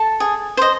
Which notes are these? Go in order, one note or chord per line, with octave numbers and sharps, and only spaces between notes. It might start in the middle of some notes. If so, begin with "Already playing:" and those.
Already playing: A4 A5
G#4
C5 D#5